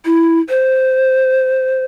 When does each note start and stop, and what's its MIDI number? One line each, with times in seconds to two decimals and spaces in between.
0.05 0.39 64
0.49 1.84 72